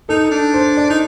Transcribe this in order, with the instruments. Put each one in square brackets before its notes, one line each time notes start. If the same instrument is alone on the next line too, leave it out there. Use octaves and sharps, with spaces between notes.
[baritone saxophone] D#4 [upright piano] A4
[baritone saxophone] D4
[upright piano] C5
D5
[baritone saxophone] D#4